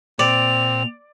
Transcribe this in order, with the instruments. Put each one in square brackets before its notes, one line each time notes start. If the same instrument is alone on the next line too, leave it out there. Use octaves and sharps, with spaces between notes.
[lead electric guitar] A#2 [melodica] C4 [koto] D5 [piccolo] F7